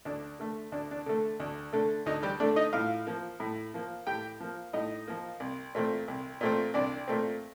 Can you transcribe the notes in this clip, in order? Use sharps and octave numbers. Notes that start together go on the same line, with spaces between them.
D2 D4
D3 A3
D2 D4
D4
D3 A3
D2
D3 A3
D2 D#4
G3 G4
D3 A3 D4 D5
D#4 D#5
A2 F4 F5
F3 A#3
A2
F3 A#3
A2 G4 G5
F3 A#3
A2 D#4 D#5
F3 A#3
C2
A#2 A3 C4
C2
A#2 A3 C4
C2 D4 D5
A#2 A3 C4